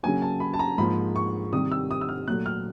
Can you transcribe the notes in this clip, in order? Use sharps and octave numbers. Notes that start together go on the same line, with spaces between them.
C#3 F#3 A#3 G#5
A5
B5
A5
A#5
G#2 F3 A#3 B5
C#6
C3 D#3 G3 D#6
E6
D#6
E6
F6
A#2 F#3 A3 F#6
F6